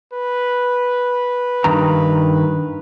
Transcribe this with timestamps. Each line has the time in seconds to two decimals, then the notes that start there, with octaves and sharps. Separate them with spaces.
0.13 B4
1.64 G2 D#3 A#5